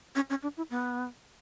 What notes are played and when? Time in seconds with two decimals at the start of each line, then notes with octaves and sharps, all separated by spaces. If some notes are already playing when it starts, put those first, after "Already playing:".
0.15 C#4
0.30 C#4
0.43 D4
0.57 E4
0.70 B3